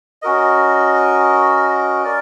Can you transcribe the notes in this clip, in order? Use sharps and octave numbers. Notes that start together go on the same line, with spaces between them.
C#4 F#4 A#4 D#5
A#4 D5